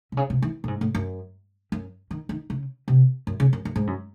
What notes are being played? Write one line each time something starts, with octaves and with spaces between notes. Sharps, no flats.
C3
C#3
C3
E3
A2
G#2
A2
F#2
F#2
D#3
D#3
C#3
C3
F#2
C#3
F#2
F#2
G#2
F#2